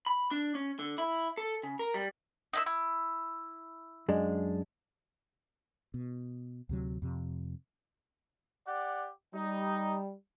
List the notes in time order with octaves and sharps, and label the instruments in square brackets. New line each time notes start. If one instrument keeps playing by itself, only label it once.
[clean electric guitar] B5
D4
C#4
D3
E4
A4
C#3
A#4
G3
[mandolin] D#4 E4 E6
E4
[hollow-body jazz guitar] F#2 G#3 D4
[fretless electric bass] B2
D2 C3 F#3
F2 C3
[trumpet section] G4 D5 F#5
[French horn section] G3 [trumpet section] D#4